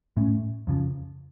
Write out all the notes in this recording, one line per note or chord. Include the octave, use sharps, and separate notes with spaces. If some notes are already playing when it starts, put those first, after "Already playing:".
A2 A3 C#4
F2 C#3 F3